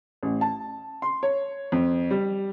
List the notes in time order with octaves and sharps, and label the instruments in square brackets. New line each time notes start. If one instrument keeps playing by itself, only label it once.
[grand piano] A1
A5
C6
C#5
F2
G3